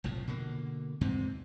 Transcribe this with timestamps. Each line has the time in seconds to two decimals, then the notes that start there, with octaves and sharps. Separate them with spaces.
0.04 F1 B1 A2 F3
0.27 B2 D3 A#3
1.01 E2 G#2 C3 C4